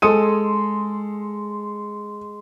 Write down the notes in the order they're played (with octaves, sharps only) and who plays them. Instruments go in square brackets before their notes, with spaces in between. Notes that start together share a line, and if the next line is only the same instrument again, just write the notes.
[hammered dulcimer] G#3 [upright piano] A4 D#6 D#7